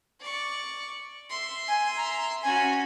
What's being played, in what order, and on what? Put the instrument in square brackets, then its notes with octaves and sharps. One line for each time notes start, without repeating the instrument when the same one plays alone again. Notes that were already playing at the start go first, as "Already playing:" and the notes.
[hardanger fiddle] D5 C#6
E5 C6
[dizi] G#5
A#5
[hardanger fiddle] C#4 F#4 [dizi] G#5